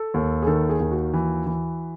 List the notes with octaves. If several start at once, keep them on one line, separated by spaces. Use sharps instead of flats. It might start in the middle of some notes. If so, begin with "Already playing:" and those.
Already playing: A4
D#2
G#4
D#3 A4
G#4
D#2
F#4
E3
E3